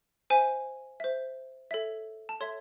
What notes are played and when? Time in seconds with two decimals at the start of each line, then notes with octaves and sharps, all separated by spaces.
0.30 C5 E5 G#5
1.00 C5 E5
1.71 A4 C#5 E5
2.29 A5
2.40 A4 C#5 E5 C6